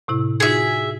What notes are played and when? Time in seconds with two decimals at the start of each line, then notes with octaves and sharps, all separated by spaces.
0.08 A2 C3 E4
0.40 D#4 F4 F#4 G#4 E5